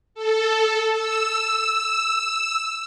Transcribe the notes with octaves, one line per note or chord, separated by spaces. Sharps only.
A4
E6